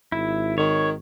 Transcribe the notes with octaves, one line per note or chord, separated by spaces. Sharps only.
G#1 E4
D#3 C#5